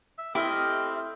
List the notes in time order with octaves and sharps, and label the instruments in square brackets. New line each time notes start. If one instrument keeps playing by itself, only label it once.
[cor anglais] E5
[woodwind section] A3 A4 F6 [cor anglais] C4 [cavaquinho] E4 E5 [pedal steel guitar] G4 D#5